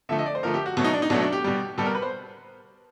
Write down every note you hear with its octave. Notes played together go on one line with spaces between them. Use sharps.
D3 F3 A3 E5
D#5
D5
C5
D3 F3 A3 A#4
G4
F#4
B2 F#3 A3
D#4
D4
D#4
B2 F#3 A3 D4
D4
G4
B2 G3
B2 G3 A4
A#4
B4
C5